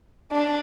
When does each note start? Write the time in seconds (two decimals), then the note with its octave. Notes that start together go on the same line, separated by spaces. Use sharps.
0.32 D4